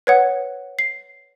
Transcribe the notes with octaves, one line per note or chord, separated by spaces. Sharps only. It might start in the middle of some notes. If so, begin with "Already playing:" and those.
B4 C#5 F#5
C7